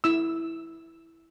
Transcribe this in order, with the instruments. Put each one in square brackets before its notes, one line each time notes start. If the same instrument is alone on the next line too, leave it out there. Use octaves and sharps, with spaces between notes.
[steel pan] E4 E6